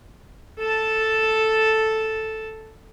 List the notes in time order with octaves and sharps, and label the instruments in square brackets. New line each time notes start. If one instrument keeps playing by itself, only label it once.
[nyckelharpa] A4 A5